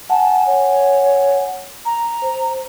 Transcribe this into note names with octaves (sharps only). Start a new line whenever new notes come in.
F#5 G#5 A5
C#5
A#5
C5